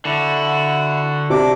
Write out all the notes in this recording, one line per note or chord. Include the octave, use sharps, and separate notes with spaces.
D3 E4 F#4
C3 D4 D6